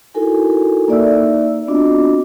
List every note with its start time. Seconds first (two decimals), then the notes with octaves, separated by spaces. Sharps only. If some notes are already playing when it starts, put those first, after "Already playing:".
0.14 D#4 E4 F#4 A4 A#4 G#5
0.88 A#3 D#4 D5 E5 E6
1.68 B3 C4 D4 F4 F#4 D#5